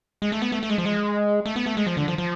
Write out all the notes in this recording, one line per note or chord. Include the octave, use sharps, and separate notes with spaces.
G#3
A3
B3
A3
A3
G#3
F3
G#3
A3
B3
A3
G#3
F3
D3
F3
F3